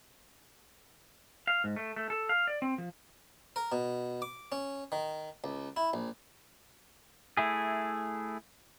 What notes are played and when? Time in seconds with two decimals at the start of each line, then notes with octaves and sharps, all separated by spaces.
1.47 F5
1.64 G#2
1.76 A3
1.96 A3
2.10 A4
2.29 F5
2.47 D5
2.62 C4
2.78 F3
3.56 A#4
3.72 B2
4.22 D6
4.52 C#4
4.92 D#3
5.44 C#2
5.76 E4
5.94 A#1
7.37 A3 E4 G#4